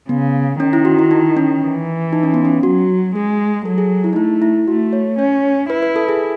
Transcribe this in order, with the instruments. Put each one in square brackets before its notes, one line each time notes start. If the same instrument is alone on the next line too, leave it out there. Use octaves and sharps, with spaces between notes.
[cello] C#3 [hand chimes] B3
[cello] D#3 [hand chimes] C#4
[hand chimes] E4
F#4
E4
D#4
C#4
[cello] E3
[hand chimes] D#4
C#4
B3
C#4
[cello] F#3 [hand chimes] F#4
[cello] G#3 [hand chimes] G#4
[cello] F#3 [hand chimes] A4
[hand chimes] G#4
E4
D#4
[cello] A3 [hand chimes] E4
[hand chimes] E4
[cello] A3 [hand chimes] F#4
[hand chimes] C#5
[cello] C#4 [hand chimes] C#5
[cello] E4 [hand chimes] B4
[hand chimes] B4
A4
G#4